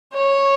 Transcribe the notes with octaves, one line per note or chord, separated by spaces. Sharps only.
C#5